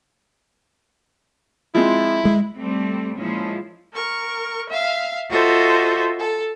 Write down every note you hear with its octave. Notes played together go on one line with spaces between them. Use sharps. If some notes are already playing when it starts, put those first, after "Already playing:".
F3 G#3 C4 E4
G#3
G3 A3 C4
A#2 F3 G#3 C#4 E4
A#4 C#6
E5 F5
F4 F#4 A4 C5 D#5 E5
A4